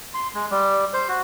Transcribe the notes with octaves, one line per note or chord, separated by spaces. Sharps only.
C6
G#3
G3
C5
F#4